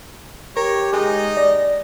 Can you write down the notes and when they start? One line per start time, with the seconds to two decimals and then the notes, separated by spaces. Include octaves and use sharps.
0.57 G4 A#4 C#5
0.93 G#3 D#4 D#5
1.37 D5 A#6